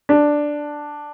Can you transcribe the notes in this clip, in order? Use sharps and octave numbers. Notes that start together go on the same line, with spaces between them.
D4